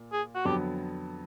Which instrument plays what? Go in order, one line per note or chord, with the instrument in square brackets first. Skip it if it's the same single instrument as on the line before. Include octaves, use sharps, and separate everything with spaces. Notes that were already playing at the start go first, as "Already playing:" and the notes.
Already playing: [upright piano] A#2
[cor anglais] G#4
F#4
[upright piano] F2 D3 F#3 B3 [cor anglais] G4